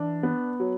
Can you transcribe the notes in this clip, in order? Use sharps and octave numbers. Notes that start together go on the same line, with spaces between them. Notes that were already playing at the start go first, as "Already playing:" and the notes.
Already playing: E3 D4
B3
F#3